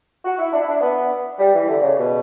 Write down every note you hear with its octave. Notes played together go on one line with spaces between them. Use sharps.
F#4
E4
D4
E4
D4
B3
G3
E3
D3
C#3
B2